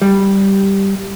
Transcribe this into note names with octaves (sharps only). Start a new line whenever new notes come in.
G3